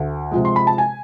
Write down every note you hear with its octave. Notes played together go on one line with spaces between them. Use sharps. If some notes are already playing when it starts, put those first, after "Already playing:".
Already playing: D2
C3 F3 G#3
C6
B5
A5
G#5